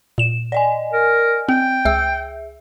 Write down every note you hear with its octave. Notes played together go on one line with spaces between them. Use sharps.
A#2 E7
D5 D#5 G#5
A#4
C4 G5
C#2 G#4 E5 E6